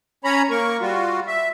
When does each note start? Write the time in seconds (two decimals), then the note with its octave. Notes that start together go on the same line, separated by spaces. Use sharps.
0.24 C#4 C#5 A#5 B5
0.50 A#3 A#4 C#6
0.81 G3 F4 F#4
1.27 E5